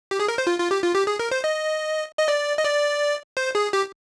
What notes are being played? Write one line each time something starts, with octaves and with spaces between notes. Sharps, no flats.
G4
G#4
A#4
C5
F4
F4
G4
F4
G4
G#4
A#4
C5
D#5
D#5
D5
D#5
D5
C5
G#4
G4